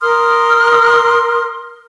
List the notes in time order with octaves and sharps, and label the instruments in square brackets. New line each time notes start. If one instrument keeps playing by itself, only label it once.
[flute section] A#4 C6 D#6 F6